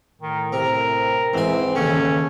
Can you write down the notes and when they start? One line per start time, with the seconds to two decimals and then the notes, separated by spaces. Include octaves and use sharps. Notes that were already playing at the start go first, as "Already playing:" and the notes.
0.22 A2 D#3
0.52 C3 A#4
1.34 G#2 E3 C4 G#5
1.75 D#2 C#3 E3 C#4 A4